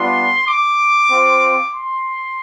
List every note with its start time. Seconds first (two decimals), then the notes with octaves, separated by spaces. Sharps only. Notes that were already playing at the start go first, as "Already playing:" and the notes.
Already playing: G3 B3 D4 F4 C6
0.48 D6
1.09 C4 F4
1.73 C6